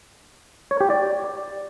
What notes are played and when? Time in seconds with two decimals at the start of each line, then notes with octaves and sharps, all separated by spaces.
0.71 C#5
0.80 G4
0.90 D5